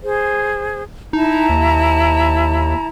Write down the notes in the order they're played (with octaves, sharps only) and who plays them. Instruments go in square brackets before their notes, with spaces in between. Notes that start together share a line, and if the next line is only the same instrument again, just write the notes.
[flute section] G#4 C5
[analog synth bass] D#4 [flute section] E4 A5 A#5
[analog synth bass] D#2